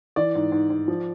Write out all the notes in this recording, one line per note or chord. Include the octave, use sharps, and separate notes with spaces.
E3 D5
G#2
G#2
G#2
F3